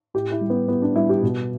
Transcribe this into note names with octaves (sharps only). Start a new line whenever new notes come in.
A2 G4
E4
G3
B3
A2 B3
D4
G3 E4
G4
B2